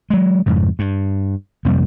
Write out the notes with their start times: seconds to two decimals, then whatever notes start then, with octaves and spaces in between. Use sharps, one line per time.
0.10 F#3 G#3
0.46 F2 G#2 C#3
0.79 G2
1.65 F2 C3 G3 A#3